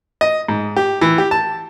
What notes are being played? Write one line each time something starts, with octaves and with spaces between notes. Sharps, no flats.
D#5
G#2
G4
E3
G4
A5